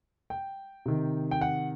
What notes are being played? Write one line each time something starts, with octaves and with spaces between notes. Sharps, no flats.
G5
C3 D#3
G5
F#5